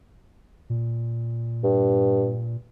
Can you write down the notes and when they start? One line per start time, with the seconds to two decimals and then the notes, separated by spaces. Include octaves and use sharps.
0.70 A#2
1.64 G2